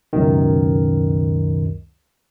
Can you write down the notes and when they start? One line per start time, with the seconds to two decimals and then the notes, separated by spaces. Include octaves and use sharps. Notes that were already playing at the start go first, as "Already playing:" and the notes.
0.13 C#2 F#2 B2 D#3